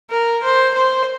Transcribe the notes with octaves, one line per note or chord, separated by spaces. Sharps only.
A#4
C5
C5